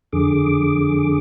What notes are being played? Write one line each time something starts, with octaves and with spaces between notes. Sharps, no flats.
F2 D3 G#4 D6